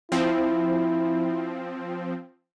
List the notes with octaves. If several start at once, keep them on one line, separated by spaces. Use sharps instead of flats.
F3 C4 E4